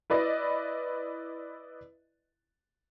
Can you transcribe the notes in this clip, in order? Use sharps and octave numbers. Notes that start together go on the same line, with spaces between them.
E4 B4 D5 D#5